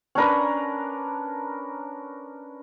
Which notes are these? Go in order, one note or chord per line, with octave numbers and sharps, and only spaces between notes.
C#4 D4 A#4 B4